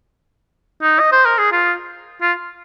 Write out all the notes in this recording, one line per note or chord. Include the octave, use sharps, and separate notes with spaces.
D#4
D#5
C5
A#4
G#4
F4
F4